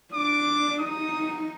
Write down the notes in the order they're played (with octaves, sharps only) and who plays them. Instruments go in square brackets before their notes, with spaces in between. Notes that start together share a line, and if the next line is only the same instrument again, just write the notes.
[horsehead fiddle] D4 [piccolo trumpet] D6
[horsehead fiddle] D#4 [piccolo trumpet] D#6